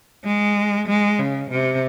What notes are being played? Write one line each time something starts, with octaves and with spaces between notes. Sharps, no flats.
G#3
G#3
C#3
C3